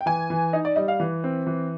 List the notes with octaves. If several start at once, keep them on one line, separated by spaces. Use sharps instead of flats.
G5
E3 G#5
E3
D#4 D#5
D5
G3 D#5
F5
E3
C4
E3